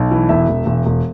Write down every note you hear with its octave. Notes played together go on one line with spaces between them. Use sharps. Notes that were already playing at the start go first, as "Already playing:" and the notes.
Already playing: B1
E3
E1 E5
E1
E1
E1